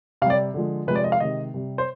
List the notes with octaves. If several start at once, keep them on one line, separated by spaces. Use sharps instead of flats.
C3 G3 D5 F5
D3 F3 G#3
C3 F3 G#3 B4
D5
D#5
F5
C3 D#3 G#3 D#5
C3 G3
C5